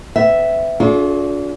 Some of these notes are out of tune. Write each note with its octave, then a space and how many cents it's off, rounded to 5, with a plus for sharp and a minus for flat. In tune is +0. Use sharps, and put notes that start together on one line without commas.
B3 +40 E5 +0
D4 -35 F4 +40 G#4 +45